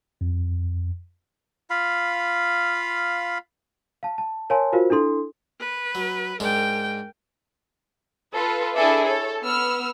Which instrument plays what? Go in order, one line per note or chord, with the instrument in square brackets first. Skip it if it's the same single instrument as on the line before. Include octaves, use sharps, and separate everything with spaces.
[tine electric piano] F2
[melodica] F4 F5 B5
[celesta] F5 A5
A5
A#4 C#5 F5 G#5 A5 C6
F4 F#4 A#4 C5 F5
D4 E4 A4 C6
[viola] B4
[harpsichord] F#3
[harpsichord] G#2 G#3 D4 [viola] A#4 G5
[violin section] F4 A4 B4
D4 E4 G#4 A4 D5 E5
A4 C#5
B3 E6 F6